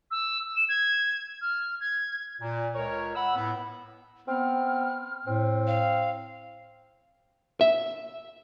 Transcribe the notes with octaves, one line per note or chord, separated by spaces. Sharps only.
E6
E7
G#6
F6
G#6
A#2
C#2 A#4 C#5
F#5 B5 E6
A2 B3
B3 C4 F6
A2 C4
F5
E5